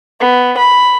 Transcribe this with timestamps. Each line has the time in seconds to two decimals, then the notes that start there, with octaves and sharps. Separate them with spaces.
0.20 B3
0.58 B5